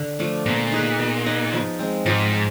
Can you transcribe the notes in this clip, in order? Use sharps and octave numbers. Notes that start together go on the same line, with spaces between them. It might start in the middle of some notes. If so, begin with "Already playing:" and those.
Already playing: D3
F3 A3 D4
A#2 B3
D#4 G#4 B4
B3
D#4 G#4 B4
F3
G#3 C4
G#2 F3
G#3